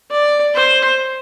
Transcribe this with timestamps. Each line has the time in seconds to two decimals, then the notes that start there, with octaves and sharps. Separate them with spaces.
0.11 D5
0.54 C5